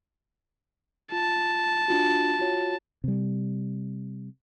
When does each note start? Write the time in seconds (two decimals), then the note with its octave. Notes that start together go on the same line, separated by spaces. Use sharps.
1.12 F4 A5
1.88 D4 F4 F#4
2.39 F4 F#4 C#5
3.04 C3 G3